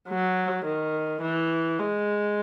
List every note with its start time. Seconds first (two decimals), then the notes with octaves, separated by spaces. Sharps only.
0.09 F#3
0.65 D#3
1.22 E3
1.79 G#3